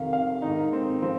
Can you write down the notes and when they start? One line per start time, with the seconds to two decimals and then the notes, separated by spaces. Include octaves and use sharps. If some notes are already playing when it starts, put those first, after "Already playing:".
Already playing: F2 C3 D#3 F5
0.13 F5
0.42 G#2 D#3 D#4
0.73 C4
1.02 F3 C4